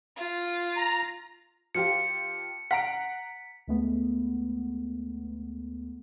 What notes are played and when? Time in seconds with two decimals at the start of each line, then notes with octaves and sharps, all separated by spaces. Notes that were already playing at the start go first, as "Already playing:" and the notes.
0.17 F4
0.77 A#5
1.75 F3 F4 G4 C#7
2.71 F#5 A#5 B6 D7
3.68 D2 G#3 A3 B3